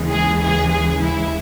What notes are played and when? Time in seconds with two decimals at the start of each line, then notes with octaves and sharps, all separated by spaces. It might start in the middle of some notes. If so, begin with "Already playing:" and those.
Already playing: D#2 C#3 E3 G#3
0.09 G#4
0.40 G#4
0.71 G#4
1.02 E4